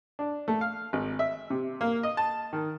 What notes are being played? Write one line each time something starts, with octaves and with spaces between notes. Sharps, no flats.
D4
A3
F5
G#1
E5
C3
A#3
D#5
A5
D#3